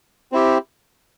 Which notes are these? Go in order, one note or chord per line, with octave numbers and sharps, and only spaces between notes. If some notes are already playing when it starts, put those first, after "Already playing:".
C4 E4 G4